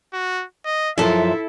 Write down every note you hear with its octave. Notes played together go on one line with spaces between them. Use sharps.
F#4
D#5
F#2 F3 E4 A4 E5